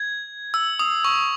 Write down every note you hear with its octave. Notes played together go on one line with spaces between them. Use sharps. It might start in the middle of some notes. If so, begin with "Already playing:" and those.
Already playing: G#6
E6
D#6
C#6